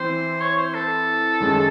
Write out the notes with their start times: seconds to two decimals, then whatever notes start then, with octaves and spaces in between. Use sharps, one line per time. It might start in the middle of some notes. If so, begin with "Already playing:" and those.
Already playing: E3 C4 E4 C5
0.41 C#5
0.58 C5
0.74 A4
1.40 F#2 D#3 G#3 C#4 G#4